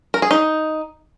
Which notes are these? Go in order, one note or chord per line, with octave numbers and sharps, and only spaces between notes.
A#4
G#4
D#4